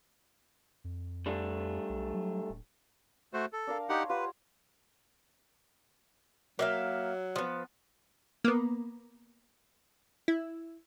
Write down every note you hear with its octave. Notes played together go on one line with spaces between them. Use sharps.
F2
G3 A3 D4
B1
F#3
D1
A3 F#4 C5
A4
D4 A#4 F5
D#4 G4 C#5 F#5 C6
F4 G4 B4 F#5
F#3 A#3 E5 F5
F3 B3
A#3 B3
E4